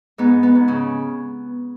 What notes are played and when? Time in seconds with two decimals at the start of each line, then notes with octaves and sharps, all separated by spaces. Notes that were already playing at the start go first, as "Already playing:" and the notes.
0.18 G#2 B3
0.43 B3
0.55 G#2
0.68 C#3 C#4